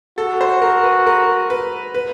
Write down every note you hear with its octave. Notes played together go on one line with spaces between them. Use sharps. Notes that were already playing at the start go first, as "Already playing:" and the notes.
F#4 A4
C5
A#4
B4
A#4
B4
B4